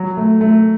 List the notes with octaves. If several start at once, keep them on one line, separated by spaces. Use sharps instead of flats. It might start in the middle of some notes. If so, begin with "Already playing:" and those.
Already playing: F#3
A3
A3